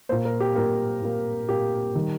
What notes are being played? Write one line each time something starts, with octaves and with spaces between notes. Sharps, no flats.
A#2 A#3 C5
A#4
G4
A#2 A#3 A#4
A#2 A#3
A#2 A#3 G4
D#3 G3